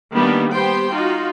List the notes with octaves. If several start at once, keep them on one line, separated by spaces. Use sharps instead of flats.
D#3 G3 A#3 B3 D4
B3 G4 C5 G5 C6
D#4 F4 F#4